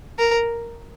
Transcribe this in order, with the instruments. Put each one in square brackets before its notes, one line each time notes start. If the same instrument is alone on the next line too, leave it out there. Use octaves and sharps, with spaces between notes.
[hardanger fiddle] A#4